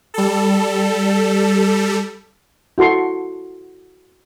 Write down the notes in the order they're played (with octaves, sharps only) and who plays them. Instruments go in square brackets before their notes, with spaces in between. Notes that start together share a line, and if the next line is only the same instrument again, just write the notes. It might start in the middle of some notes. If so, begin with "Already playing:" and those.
[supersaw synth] G3 A4
[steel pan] E4 F#4 A4 C6 C#6